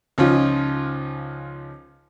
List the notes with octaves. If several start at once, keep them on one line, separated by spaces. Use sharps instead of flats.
C#2 F3 C#4 D#4 F4